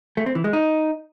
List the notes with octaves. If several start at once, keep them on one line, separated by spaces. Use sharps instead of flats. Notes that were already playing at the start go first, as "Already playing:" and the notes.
A3
C4
E3
G#3
D#4